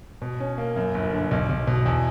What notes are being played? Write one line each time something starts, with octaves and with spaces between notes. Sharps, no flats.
B2
C#4
A#3
F#2
G1
D3
B1
B1
B2
E2